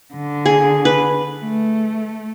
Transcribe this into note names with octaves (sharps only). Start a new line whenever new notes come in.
D3
G#4
B4
A3